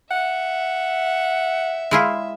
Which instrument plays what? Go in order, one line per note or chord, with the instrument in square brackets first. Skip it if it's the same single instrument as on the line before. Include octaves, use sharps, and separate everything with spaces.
[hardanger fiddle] E5 [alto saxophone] F#5
[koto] G#3 E4 F4